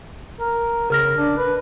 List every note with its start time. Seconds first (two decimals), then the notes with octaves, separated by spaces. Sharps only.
0.40 A#4
0.90 C#3 A#4 F6 A#6
1.17 D4
1.37 B4